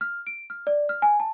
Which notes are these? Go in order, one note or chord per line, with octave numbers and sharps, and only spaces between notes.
F6
D7
F6
D5
F6
G#5
A5